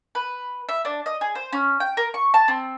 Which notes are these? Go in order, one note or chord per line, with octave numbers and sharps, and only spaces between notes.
B4
E5
D4
D#5
G#4
C5
C#4
G5
A#4
C#6
A5
C4